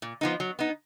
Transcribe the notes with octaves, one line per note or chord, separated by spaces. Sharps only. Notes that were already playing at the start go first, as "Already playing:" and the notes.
A#2
F3 B3 D#4
F#3
B3 D#4